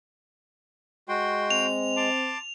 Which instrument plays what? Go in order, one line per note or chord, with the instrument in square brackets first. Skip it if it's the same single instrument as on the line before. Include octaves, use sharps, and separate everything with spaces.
[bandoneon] G#3 [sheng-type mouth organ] F#4 G5 C6
[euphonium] C4 [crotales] F7
[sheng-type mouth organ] A5 C6 D6